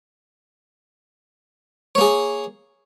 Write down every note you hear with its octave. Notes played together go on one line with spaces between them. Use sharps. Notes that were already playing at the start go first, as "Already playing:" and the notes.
A#3 G#4 C#5